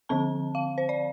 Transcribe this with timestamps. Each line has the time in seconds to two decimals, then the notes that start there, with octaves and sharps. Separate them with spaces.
0.09 D3 F3 C4 A5
0.55 F5
0.78 C5
0.89 D5